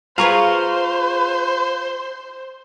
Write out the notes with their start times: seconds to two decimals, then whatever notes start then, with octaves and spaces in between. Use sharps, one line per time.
0.18 F4 G#4 B4 C5 F5 A#5 C#6